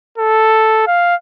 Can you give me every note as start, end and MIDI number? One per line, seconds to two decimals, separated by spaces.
0.18 0.83 69
0.87 1.15 77